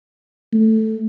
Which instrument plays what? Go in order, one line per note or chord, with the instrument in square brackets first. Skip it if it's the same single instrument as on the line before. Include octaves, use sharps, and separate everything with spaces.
[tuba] A3